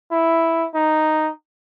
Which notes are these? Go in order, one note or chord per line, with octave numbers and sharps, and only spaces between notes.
E4
D#4